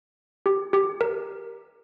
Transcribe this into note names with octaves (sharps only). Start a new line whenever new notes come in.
G4
G4
A#4